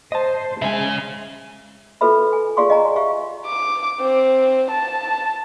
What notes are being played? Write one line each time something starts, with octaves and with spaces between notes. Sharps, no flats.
C5 D#5 A5
C#3 G#3 E5 G#5
F4 F#4 A4 B4 E5 B5
G#5
F4 G#4 D5 F5 C6 C#6
D#5 G#5 A#5
G4 E5 F5 C#6
D6
C4
A5